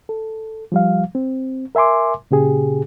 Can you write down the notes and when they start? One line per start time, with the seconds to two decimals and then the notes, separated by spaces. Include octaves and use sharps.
0.09 A4
0.72 F3 G3 F5
1.15 C4
1.75 A#4 E5 G#5 C6 D6
2.31 A#2 C#3 G4 G#4